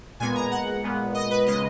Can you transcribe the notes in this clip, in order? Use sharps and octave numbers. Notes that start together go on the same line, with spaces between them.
A#2 G#3 B3 G#5
A#5
F#5
A#2 G#3 B3
D#5
B4
C#3 G#3 D#5